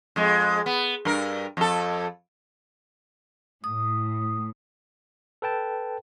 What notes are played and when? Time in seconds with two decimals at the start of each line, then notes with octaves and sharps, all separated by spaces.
0.16 F2 G#3
0.66 B3
1.05 G2 A#4
1.57 F2 A4
3.64 A2 D#6
5.42 A4 B4 G5 A5